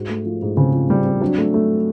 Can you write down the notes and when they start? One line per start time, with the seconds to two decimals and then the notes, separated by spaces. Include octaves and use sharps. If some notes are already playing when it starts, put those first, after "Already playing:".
Already playing: G#2 F#4
0.09 A3
0.25 F3
0.42 G#2
0.57 C#3 C4
0.73 F3
0.90 G3 C4
1.05 C4
1.21 F#3 D4
1.38 A3
1.54 A3